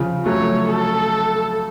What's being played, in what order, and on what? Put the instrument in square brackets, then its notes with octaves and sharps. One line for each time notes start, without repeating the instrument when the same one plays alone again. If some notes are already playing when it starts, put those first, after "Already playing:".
Already playing: [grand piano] C#3 F3
[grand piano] F#3 A3 [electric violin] C#5
[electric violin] A4